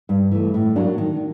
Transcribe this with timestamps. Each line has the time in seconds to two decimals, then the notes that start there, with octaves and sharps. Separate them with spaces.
0.09 G2
0.32 E3 A3
0.54 A2
0.76 F#3 A#3 D4
0.98 D#3